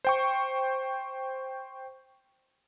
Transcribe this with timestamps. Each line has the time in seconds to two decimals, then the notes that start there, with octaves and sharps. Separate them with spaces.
0.05 C5 G5 C#6